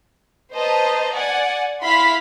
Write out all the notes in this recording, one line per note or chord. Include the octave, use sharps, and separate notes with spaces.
B4 C5 D#5 A5 A#5
D5 F#5 G#5
E4 F5 B5 C6 B6